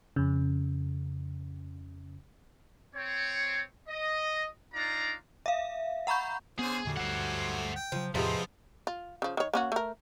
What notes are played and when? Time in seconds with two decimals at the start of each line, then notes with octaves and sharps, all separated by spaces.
0.16 F2 C#3
2.95 C4 C#5
3.89 D#5
4.74 D4 D#4 F4 D5 A#5
5.46 E5 F5
6.07 F#5 A#5 B5 C#6 G6
6.59 D3 B3 C#4 G#4 C5
6.85 E2 A#2 D3 F#3 G3 A3
6.97 D2 G2 C5 F#5
7.76 G5
7.92 C#3 F3 F#3
8.15 E2 A2 C3 F3 G#3 B3 C4 F4
8.87 F4
9.22 C#3 F3
9.37 D#3 C#5
9.54 A#3 C#4 F#4
9.72 A3 A#4